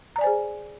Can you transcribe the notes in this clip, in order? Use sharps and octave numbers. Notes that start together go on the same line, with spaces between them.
G#4 C5 D5 G#5 A#5